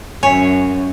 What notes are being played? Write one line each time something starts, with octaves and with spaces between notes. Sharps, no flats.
F#2 C#5 E5 G#5